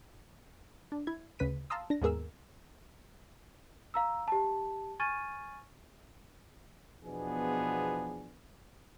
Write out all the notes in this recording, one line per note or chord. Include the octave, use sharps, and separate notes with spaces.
D4
E4 G#6
D2 C#3 B4 B6 D#7
F5 A5 A#5 C6 D#6 E6
D4 A#6
D#2 G#2 B3 G#4 A#4 E6
F5 A#5 E6
G4 A5
G#5 C#6 F6 G#6 A6 D#7
E2 B2 F3 B3 D4 G#4